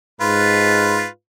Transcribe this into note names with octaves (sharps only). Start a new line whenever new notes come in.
G#2 F4 B4